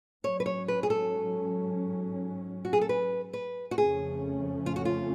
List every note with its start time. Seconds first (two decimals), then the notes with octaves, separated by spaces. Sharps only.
0.24 G#2 F#3 C#4 C#5
0.40 B4
0.46 C#5
0.68 B4
0.83 G#4
0.90 A4
2.65 F#4
2.73 G#4
2.81 A4
2.89 B4
3.33 B4
3.71 F#4
3.78 F2 C#3 F3 A3 C#4 G#4
4.66 F4
4.76 F#4
4.85 F4